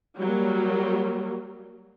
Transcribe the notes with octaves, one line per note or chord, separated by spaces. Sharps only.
F#3 G3 A#3